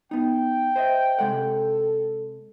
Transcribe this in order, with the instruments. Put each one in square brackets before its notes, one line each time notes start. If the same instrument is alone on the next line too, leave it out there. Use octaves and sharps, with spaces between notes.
[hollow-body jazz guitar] B3 D#4 [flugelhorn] G5
[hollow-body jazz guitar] C5 D#5 E5
[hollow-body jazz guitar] C3 G#3 F#5 [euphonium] A4